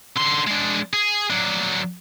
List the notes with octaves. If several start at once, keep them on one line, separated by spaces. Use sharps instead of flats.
D3 C6
G#3 D4
G#4
F#3 D4